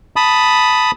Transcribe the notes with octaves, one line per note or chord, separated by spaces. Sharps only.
A5 B5 D#6